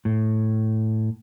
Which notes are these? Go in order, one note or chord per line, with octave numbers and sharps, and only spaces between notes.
A2